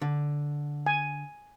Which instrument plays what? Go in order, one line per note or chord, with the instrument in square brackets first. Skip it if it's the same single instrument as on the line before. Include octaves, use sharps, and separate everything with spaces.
[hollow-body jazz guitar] D3
[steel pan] G#5